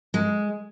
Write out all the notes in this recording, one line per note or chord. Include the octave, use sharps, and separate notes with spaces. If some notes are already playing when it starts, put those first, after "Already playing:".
G#3